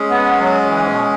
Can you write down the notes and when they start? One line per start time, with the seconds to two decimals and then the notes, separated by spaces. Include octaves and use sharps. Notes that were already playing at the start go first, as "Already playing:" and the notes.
Already playing: G#3 C#4 G#4
0.10 B3
0.38 F#3
0.66 E3
0.80 G#2
0.88 B2